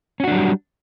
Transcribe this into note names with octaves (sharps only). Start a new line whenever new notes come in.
F#3 G3 C#4 D4 F#4